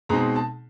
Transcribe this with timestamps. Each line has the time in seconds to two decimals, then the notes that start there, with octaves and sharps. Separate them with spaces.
0.09 B2 G#3 C4 D#4 A#5
0.36 A5